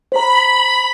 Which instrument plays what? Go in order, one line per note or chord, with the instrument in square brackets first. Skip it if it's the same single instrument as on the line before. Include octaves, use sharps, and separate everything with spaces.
[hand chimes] C5 A#5 [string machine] B5